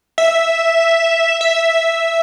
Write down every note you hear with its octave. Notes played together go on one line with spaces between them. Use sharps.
E5
E5